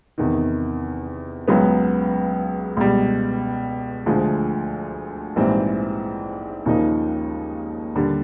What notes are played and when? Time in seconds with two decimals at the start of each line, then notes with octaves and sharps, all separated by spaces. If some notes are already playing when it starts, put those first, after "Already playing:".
0.18 E2 C3 D#3
1.48 C#2 C#3 F#3 B3
2.77 C#2 B2 G3
4.06 D2 D3 F3 G#3
5.36 A#1 G#2 E3 G3 C4
6.65 D#2 C#3 F3 A#3 D#4
7.95 D#2 D3 G3